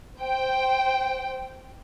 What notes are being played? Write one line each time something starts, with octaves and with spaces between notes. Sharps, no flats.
C5 G5